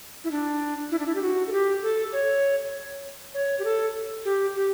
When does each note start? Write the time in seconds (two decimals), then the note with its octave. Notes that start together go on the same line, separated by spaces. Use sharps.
0.24 E4
0.31 D4
0.91 E4
0.99 D4
1.06 E4
1.15 G4
1.22 F#4
1.48 A4
1.52 G4
1.83 A4
2.13 C#5
3.34 C#5
3.59 G4
3.64 A4
4.25 G4
4.56 G4